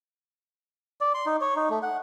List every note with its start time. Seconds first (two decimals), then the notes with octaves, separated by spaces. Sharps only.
1.01 D5
1.14 C6
1.26 D#4
1.41 C#5
1.56 D#4
1.70 A3
1.83 F#5